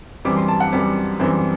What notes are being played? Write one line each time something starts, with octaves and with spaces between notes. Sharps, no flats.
F#2 E3 G3 C4 D6
C6
A5
F#5
F#2 E3 G3 C4
F#2 E3 G3 C4